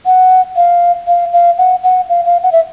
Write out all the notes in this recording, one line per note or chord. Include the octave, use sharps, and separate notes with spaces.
F#5
F5
F5
F5
F#5
F#5
F5
F5
F#5
E5